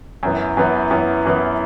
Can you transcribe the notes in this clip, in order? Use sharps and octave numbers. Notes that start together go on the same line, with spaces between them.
F#2 E3 B3
F#2 E3 B3
F#2 E3 B3
F#2 E3 B3